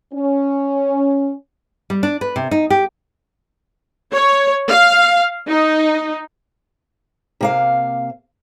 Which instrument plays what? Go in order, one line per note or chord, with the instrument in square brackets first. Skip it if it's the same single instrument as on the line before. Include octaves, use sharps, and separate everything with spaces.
[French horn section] C#4
[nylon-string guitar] G3
D4
B4
C3
D#4
G4
[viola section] C#5
F5
D#4
[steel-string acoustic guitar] C3 A#3 F5